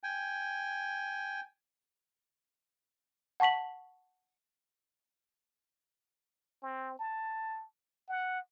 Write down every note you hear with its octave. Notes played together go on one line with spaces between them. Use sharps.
G5 G#5
F#5 A5 C#6 B6 F#7
C4
A5
F#5